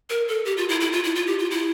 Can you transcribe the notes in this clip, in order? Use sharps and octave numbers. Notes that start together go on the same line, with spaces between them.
A#4
A4
G4
F4
E4
E4
F4
E4
F4
G4
F4
E4